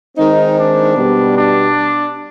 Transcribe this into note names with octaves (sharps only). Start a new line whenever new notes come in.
D#3 G#3 C4 D#4
D4
B2 G3 B3
D4